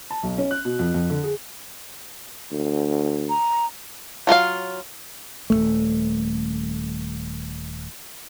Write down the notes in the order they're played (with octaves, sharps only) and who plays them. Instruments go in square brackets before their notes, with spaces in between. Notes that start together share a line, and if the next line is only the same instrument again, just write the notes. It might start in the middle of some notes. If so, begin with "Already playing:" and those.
[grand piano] A5
B1
C#4
F#6
B2
F2
F2
D3
G#4
[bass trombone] D2
[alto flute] A#5
[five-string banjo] F#3 F4 A#4 F5
[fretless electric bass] D#1 E2 A3